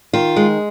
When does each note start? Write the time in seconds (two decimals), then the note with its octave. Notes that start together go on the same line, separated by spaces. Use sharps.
0.13 D#3 F4
0.36 G#3